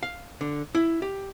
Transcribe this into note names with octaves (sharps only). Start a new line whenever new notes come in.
F5
D3
E4
G4